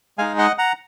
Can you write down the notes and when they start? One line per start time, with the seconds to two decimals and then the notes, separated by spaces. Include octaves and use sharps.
0.18 G#3 D#4 G#4 F5 G#5
0.38 D#5 F#5
0.58 F#5 A#5